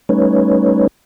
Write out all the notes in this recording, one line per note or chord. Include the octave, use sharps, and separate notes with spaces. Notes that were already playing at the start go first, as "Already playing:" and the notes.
G3 A3 C#4 D#4 B4 C#5